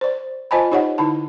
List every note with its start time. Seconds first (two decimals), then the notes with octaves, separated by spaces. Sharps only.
0.01 C5 D5
0.51 F4 C5 D#5 G#5 A5 B5
0.72 D#4 G4 C#5 D#5 F#5
0.98 D3 D#4 E4 A5